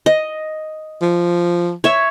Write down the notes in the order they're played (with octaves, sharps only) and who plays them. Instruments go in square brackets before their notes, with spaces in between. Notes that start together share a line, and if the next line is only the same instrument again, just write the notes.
[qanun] D#5
[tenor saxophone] F3
[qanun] C#5 E5